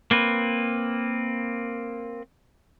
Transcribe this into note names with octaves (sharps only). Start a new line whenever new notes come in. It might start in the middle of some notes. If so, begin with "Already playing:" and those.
A#3 C4 B4